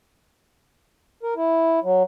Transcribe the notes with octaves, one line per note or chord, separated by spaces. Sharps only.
A#4
E4
F#3